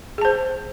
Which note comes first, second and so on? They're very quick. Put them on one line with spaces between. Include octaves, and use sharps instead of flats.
G#4 A5 C5